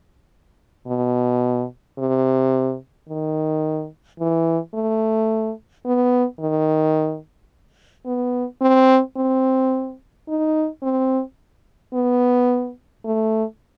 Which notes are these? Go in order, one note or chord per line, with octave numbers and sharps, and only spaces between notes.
B2
C3
D#3
E3
A3
B3
D#3
B3
C4
C4
D#4
C4
B3
A3